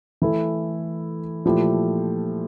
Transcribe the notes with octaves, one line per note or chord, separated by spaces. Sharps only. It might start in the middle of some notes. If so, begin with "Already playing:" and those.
E3 A3 E4 A4
A#2 F3 A3 E4 G4